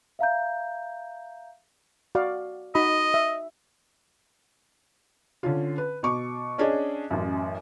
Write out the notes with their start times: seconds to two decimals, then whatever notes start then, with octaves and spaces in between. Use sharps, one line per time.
0.19 E5 F5 A#5 G6
2.15 F#4 D5 F5
2.75 D#4 F#4 D#5 B5
3.14 E5
5.43 D3 C#4 F4
5.78 B4
6.03 B2 C#6 D6
6.58 C#4 D4 G#4 D#5
7.10 A1 F#2